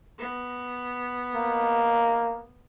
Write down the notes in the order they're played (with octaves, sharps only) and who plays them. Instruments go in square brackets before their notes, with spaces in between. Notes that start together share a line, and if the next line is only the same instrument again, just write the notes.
[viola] B3
[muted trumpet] A#3